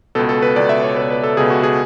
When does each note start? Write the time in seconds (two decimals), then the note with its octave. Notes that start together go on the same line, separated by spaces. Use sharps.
0.15 C#2 B2 A4
0.29 A4
0.42 B4
0.56 C#2 D5
0.60 B2
0.69 E5
0.83 C#5
0.96 C#2 B2 B4
1.10 B4
1.23 A4
1.37 C#2 B2 G#4
1.50 F#4
1.63 G#4